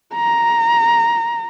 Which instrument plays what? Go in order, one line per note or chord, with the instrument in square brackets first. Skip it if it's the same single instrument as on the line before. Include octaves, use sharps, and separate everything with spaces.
[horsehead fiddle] A#5